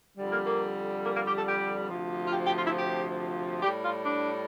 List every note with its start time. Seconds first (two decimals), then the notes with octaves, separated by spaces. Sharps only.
0.18 F2 D3 G3
0.32 A#3
0.46 A#3
1.04 A#3
1.15 A#3
1.26 G4
1.37 A4
1.47 G4
1.90 D2 C3 F3
2.26 F4
2.33 G4
2.44 G4
2.55 F4
2.65 E4
2.76 G4
3.62 A2 G3 G4
3.84 F4
4.05 D4